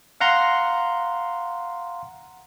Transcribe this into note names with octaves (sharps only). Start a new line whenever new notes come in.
F5 F#5 A#5 C6